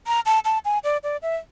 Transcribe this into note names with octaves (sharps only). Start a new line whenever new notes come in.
A#5
A5
A5
G#5
D5
D5
E5